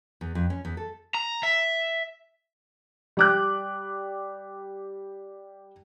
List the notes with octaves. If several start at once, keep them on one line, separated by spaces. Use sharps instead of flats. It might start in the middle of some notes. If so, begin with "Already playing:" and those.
E2
F2
C#4
E2
A4
A#5
E5
G3 D6 F#6